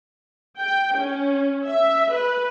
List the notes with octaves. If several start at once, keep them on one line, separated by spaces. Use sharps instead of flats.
G5
C#4
E5
B4